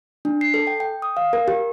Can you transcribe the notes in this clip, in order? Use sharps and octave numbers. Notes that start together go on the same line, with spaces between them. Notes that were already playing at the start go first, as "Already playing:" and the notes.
D4
C7
A4
G5
G5
D#6
F5
A#4
G4